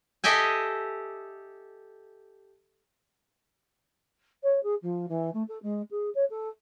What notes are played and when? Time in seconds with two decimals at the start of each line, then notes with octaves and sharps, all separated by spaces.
0.24 G4 A4 D#5 E5 G5 G#5
4.43 C#5
4.63 G#4
4.82 F3
5.08 E3
5.33 A3
5.48 A4
5.62 G#3
5.90 G#4
6.15 C#5
6.30 A4